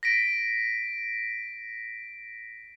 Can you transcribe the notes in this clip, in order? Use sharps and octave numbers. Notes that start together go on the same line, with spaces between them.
A#6 B6 D7